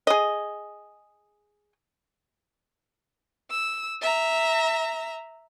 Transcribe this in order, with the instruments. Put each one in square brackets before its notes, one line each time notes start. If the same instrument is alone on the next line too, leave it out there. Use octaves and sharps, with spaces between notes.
[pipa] G#4 D#5
[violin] E6
E5 A#5